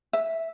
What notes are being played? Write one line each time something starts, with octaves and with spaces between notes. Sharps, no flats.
E5